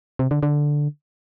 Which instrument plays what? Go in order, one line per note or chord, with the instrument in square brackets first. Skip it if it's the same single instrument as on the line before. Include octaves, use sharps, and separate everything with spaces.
[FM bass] C3
D3
D3